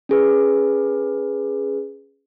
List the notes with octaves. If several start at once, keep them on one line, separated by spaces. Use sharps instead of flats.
C#4 G#4 B4